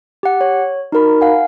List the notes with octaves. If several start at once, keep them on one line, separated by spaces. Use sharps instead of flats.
G4 F#5
C#5
D#4 F#4 A#4 B5
F5 F#5 G#5